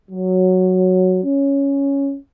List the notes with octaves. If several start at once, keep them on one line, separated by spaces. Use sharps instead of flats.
F#3
C#4